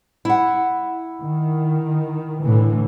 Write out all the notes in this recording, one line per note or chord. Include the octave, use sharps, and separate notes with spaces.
E4 F#5
D#3
A2 D3 E3